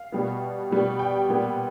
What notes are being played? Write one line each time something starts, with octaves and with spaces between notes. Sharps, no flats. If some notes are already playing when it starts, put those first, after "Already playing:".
Already playing: F5
B2 G3 B3
B2 G3 B3
G5
A#2 G3 B3